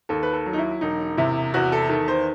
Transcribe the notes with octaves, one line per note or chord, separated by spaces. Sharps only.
D#2 A4
B4
A4
F#3
D#4
E4
E1 D#4
C3 E4
E2 F#4
A4
D#3 A4
C5